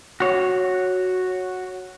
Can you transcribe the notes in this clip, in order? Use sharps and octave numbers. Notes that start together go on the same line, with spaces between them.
F#4 C#5